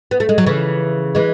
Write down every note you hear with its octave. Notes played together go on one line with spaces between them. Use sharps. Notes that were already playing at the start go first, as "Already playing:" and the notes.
B3
A3
G#3
F#3
C#3 E3
E3 G#3